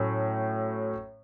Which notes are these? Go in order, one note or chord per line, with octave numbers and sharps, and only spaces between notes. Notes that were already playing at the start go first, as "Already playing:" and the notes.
Already playing: A2 F#3 A3 C#4